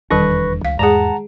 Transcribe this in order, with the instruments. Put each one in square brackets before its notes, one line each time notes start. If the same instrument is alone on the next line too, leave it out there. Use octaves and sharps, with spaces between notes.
[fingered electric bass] F1 E2 D4 [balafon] D#3 G3 [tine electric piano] B4 C#6 A#6
[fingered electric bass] C#2 [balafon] F5
[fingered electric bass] E2 G#2 [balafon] G#3 G#4 [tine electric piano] F#5 A5 A#5